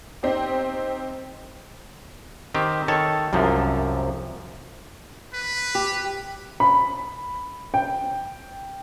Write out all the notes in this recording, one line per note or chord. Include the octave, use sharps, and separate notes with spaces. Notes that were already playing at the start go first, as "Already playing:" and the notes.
C4 D#4 G4
D#3 C4 G4
D#3 A4 C#5 A5
C2 F#2 C3 F3
B4
G4
B5
G5